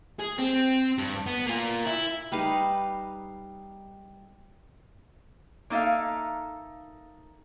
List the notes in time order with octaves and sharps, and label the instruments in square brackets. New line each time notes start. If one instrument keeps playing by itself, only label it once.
[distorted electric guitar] G#4
C4
G2
B3
A#3 F4
E4
[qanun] G3 D#4 B4 F5
[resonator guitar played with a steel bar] A#3 D#4 A4 E5 F5